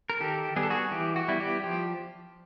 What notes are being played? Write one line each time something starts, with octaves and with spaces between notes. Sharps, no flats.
A#4
D#3 G4 A4
G3 B3 G#4
A4
F#4 G#4
E3 G4
F#4
G3 B3 E4
G4
F3 G4